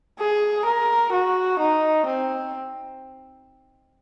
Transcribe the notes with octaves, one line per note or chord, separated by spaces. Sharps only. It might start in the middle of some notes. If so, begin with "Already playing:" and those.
G#4
A#4
F#4
D#4
C4